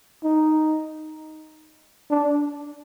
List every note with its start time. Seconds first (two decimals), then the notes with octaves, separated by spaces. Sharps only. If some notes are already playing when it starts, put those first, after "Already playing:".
0.24 D#4
2.11 D4